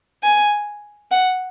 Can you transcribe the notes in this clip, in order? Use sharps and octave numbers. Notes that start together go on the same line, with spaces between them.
G#5
F#5